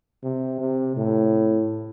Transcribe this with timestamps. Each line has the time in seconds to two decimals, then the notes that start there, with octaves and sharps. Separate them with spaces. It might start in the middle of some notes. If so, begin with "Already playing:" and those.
0.23 C3
0.60 C3
0.97 A2